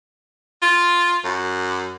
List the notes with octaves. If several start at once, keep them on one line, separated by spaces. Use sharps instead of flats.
F4
F#2